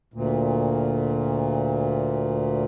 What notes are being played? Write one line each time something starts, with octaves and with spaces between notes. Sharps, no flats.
D2 A#2